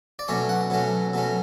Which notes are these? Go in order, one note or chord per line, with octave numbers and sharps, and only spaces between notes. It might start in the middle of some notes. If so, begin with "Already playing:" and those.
D5
B2 F#3 A3 C#4 C#5
F#5
B2 F#3 A3 C#4
B2 F#3 A3 C#4